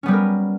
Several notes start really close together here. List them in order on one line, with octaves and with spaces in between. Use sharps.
C#4 B3 G3 B4 A#4